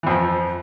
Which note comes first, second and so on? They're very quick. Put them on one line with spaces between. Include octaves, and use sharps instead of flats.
E3 F2 F3